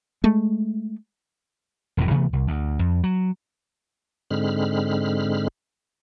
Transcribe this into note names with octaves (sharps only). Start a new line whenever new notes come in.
G#3 A3
E1 F2 A2 E3
C3 E3 A3 B3
C2
D2
F2
F#3
G#2 D3 G#3 C4 B5 F6